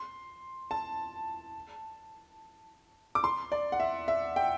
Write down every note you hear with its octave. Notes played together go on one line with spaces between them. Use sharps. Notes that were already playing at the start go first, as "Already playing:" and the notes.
Already playing: C6
A5
D6
C6
D5
F#5
E5
E5
G5